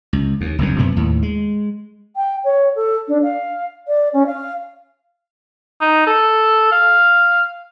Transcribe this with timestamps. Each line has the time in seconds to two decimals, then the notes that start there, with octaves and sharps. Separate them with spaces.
0.13 C#2
0.41 D#2
0.58 F#1 C2 F2 D3
0.79 F#2 C3 B3
0.96 D#2 A2
1.23 G#3
2.16 G5
2.44 C#5
2.76 A4
3.08 D4
3.23 F5
3.88 D5
4.13 C#4
4.26 F5
5.81 D#4
6.07 A4
6.72 F5